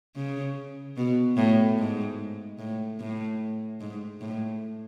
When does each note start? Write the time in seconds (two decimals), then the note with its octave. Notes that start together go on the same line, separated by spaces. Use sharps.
0.16 C#3
0.97 B2
1.37 A2
1.78 G#2
2.58 A2
3.00 A2
3.81 G#2
4.21 A2